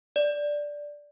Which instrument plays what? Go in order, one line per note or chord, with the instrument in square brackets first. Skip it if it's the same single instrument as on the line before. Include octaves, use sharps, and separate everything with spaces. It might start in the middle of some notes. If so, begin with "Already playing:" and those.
[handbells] D5